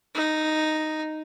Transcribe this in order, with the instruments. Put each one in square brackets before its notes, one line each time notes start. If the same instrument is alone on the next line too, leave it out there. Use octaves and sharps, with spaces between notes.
[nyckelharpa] D#4